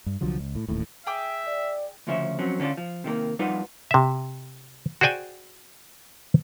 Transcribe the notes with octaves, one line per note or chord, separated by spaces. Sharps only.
G2
C2 D3 F3 F#3
C#2
A2
D#1 A1 D#2 A2
G#4 E5 G5 D6
D5
D2 C#3 F3 C#4 E5
F3 F#3 C4 C#4
D3 C#4 D4 F4
F3
C3 D#3 G3 A#3
F2 G3 D#4 F4 B4 F#5
C3 E5
F#4 G#4 C5 D5 G5 G#5